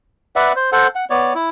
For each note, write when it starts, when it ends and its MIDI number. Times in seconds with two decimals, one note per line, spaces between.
0.36 0.52 71
0.36 0.52 74
0.36 0.52 76
0.36 0.52 78
0.56 0.70 72
0.72 0.87 69
0.72 0.87 72
0.72 0.87 78
0.95 1.05 78
1.10 1.33 59
1.10 1.33 73
1.10 1.33 74
1.35 1.50 64